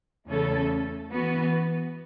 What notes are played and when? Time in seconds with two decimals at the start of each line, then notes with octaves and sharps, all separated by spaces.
0.27 E2 C#3 A3 C#4 A4
1.12 E3 B3 F#4